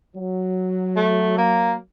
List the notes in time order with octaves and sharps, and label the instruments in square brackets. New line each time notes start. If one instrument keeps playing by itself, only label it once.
[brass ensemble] F#3
[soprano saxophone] A3
A#3